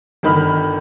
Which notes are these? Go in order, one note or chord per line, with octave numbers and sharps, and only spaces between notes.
G1 D#3 B5 F6